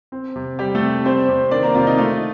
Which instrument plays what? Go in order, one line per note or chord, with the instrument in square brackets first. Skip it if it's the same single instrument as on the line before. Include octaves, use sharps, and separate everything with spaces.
[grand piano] C4
C3
G3 G4
A3 A4
C3
G3 C4 C5
C3
D#3 D4 D5
A#3 A#4
C3 F4
D#4
A3 F4